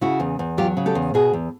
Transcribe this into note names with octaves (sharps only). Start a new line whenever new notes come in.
C#3 E4 F#4
E2
E2
F#3 F4 G4
C#3
G4 A4
E2
B2 F#4 G#4
E2